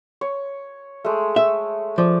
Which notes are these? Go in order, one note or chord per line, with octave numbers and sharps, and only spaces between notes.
C#5
G#3 A3
E5
F3 D5